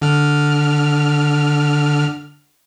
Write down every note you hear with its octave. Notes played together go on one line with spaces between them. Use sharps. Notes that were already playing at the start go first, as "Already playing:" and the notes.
D3 F6